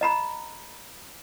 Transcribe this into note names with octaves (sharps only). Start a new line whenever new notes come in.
D#5 A#5 B5